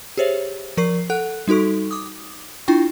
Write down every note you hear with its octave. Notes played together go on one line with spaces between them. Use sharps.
G4 G#4 C5 C#5 E5
F3 A#4 C#6 C7
A4 F#5 F#6
G3 D#4 F#4 A4 C#6
D6 D#6
D4 E4 F4 G5 C#6